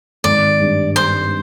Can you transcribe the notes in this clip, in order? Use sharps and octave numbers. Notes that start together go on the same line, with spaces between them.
G#1 D5
G2
G2 C5